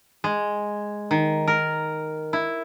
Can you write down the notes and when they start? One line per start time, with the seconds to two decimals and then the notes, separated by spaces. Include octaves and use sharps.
0.24 G#3
1.11 D#3
1.48 A#4
2.33 E4